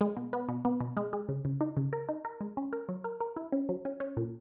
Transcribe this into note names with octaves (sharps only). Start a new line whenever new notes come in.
G#3
B2
B3
B2
B3
B2
G#3
G#3
C#3
C#3
D#4
C#3
A#4
D#4
A#4
G#3
C#4
A#4
F#3
A#4
A#4
E4
C#4
F#3
C#4
C#4
A#2